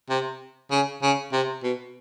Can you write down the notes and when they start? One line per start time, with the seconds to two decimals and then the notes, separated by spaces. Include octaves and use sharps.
0.10 C3
0.71 C#3
1.02 C#3
1.32 C3
1.63 B2